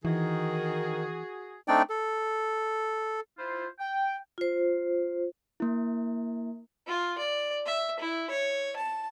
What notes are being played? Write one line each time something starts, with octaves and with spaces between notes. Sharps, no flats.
D#3 E3 F#4 G#4
A3 C4 D4 D#4 D5 G5
A4
E4 F4 C5
G5
F4 C5
A#3 E4
F4
D5
E5
E4
C#5
A5